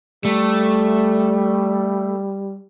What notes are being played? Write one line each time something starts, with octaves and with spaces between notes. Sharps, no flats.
G3 A3